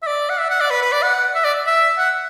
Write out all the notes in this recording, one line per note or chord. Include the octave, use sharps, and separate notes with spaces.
E5
D5
F#5
E5
F#5
D5
B4
B4
D5
F#5
E5
D5
E5
F#5